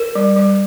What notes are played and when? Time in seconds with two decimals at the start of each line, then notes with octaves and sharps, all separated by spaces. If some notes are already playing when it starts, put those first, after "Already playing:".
Already playing: A#4
0.15 G3
0.36 G3